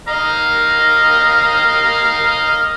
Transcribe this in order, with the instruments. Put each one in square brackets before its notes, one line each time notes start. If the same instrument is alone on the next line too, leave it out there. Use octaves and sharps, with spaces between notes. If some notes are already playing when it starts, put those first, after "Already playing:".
[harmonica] D#5 F5 A#5